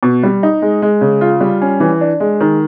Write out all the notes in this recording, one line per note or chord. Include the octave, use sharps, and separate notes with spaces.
B2
G3
D#4
G#3
G#3
C#3
F4
G3
C#4
E3
D4
G#3
D#3